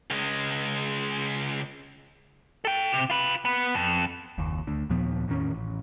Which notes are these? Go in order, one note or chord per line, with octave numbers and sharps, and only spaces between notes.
C#2 G#3
A4 G5
C3
F4 B4
B3
F2
F#1 D#2
D2 D3
D#2 A#2 F3 B3
E2 A2 D#3 C#4
A1